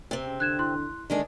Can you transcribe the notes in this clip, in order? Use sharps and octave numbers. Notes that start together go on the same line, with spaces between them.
C3 C4
C#3
D3 F#6 G#6 E7
E4 C6 F#6
D3 D#3 G#3 D4